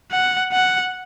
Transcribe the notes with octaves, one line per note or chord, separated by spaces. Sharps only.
F#5
F#5